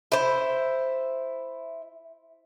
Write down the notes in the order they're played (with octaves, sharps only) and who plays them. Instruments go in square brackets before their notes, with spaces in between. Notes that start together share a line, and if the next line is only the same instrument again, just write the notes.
[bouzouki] E4 C5